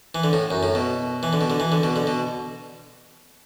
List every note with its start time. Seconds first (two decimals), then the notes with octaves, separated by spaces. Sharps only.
0.15 E3
0.24 D3
0.33 A2
0.51 F#2
0.63 A2
0.75 B2
1.23 E3
1.33 D3
1.41 B2
1.50 D3
1.60 E3
1.72 D3
1.83 B2
1.96 D3
2.07 B2